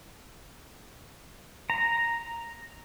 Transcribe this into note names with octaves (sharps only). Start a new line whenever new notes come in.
A#5